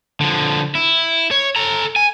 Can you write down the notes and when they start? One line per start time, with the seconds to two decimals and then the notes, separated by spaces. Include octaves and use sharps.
0.21 D3 F3
0.75 E4
1.31 C#5
1.56 A4 A#5
1.96 G#5